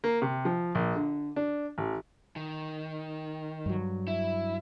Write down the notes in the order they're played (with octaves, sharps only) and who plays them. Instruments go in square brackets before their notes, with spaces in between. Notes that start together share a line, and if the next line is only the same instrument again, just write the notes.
[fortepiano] A#3
C3
F3
A#1
D3
D4
A1
[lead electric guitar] D#3
[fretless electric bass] G2 F#3
[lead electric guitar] E4